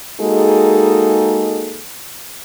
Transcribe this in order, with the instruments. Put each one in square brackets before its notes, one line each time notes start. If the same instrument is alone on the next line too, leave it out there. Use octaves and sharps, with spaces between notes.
[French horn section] G#3 A#3 D#4 F#4 G#4 A4